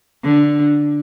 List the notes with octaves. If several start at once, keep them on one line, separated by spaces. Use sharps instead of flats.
D3